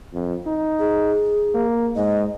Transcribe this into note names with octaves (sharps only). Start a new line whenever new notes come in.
F2
D#4
G#4
A#3
G#2 D#5